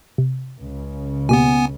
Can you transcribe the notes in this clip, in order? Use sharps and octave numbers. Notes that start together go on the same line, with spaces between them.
C3
C#2 C#3
B2 A#3 B3 G4 G#5